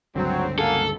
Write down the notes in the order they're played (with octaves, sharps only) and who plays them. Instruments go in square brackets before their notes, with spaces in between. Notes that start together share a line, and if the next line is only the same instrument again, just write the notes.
[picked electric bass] C#2 G2 D3 [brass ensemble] F#3 [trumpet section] C4
[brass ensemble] F#2 A#3 [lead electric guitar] A4 [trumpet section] F5 F#5 G#5